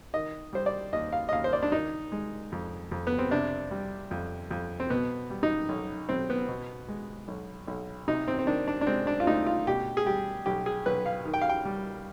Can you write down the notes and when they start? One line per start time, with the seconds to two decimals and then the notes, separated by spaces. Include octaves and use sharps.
0.14 D#3 D#5
0.53 G3 C5
0.66 D5
0.93 D#2 D#5
1.13 F5
1.29 D#5
1.33 D#2 F5
1.44 C5
1.53 D5
1.62 D4
1.72 D#3 D#4
2.12 G#3
2.52 F2
2.91 F2
3.07 B3
3.18 C4
3.31 C3 D4
3.71 G3
4.11 F2
4.51 F2
4.80 C4
4.90 B2 B3
5.30 G3
5.43 D#4
5.69 B1
6.09 B1 C4
6.30 B3
6.48 B2
6.88 G#3
7.28 B1
7.68 B1
8.08 C3 D#4
8.28 C4
8.39 C4
8.47 D#3 D4
8.67 D4
8.81 D4
8.87 G#3 C4
9.07 D4
9.20 F4
9.27 D2 D#4
9.46 F4
9.67 B2 G4
9.97 G#4
10.06 G3 G4
10.46 B1 G4
10.66 G#4
10.86 B1 B4
11.06 F5
11.25 D#3
11.34 G5
11.42 F5
11.49 G5
11.65 G3